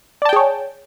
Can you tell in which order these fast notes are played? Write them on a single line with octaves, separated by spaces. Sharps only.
D5 A5 G5 G#4 C#5